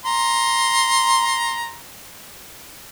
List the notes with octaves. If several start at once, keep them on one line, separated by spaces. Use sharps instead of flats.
A#5 C6